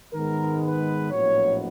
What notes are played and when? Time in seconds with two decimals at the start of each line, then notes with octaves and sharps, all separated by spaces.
0.13 G#2 D#3 G#3 B3 A#4
0.63 B4
1.11 A#1 A2 F#3 B3 C#5